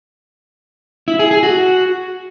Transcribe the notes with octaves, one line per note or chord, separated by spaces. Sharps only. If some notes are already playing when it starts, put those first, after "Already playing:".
E4
G#4
G#4
F#4